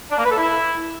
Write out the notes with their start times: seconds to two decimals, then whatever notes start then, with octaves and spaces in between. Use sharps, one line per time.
0.11 D4
0.18 A#3
0.24 B4
0.31 A4
0.37 E4